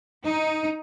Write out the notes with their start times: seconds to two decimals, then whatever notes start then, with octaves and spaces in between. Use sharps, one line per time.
0.22 D#4